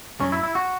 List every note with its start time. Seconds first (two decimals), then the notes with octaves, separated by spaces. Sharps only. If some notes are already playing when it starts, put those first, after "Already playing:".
0.20 F#2 F#3 C#4
0.32 E4
0.43 E4
0.55 F#4